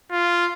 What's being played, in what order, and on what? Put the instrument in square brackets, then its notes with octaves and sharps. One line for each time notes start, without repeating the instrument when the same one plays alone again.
[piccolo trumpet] F4